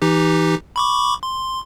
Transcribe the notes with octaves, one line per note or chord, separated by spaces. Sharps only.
E3 D#4 G4
B5 C#6 D6
C6